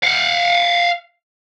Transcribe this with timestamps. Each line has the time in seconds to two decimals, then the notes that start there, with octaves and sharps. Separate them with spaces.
0.04 F5 F#5